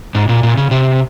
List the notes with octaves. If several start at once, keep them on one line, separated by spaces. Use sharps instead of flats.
G#2
A#2
A#2
C#3
C3